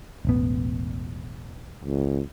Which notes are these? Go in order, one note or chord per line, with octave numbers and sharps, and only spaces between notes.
E1 A1 B3
C#2